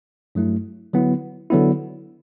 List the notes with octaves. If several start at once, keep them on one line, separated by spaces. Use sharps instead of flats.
G2 F#3 A3 E4
D3 F#3 B3 E4
D3 F#3 B3 E4